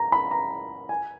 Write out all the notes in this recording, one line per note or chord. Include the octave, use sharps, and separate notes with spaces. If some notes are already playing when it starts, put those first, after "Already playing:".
Already playing: A#5
B5
A#5
G#5